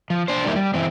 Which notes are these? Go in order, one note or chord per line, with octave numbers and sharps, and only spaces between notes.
F3
D4 C5
D3 D#3 G3 A#3 E4
G3
E3 C4